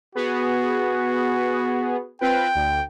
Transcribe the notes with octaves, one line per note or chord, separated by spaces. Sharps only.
B3 F#4 G#4
C4 F4 B4 G5
D2